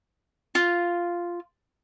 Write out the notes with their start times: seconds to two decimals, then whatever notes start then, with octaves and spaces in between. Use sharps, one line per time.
0.55 F4